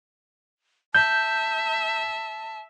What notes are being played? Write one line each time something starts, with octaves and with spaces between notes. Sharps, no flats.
E5 A5 G6